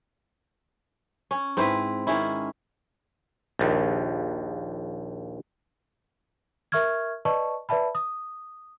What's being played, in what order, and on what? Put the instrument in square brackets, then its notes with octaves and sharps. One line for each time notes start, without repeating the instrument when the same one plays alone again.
[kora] C#4
G#2 C4 E4 B4
D#3 G#3 C#4 E4
[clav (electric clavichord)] A#1 D#2
[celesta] A#4 E5 C#6 F6 G#6
B4 D5 D#5 A5 C#6
B4 D5 E5 A5 B5
D#6